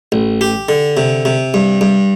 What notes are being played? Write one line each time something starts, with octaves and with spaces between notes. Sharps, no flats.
A1
G4
D3
C3
C3
G2
G2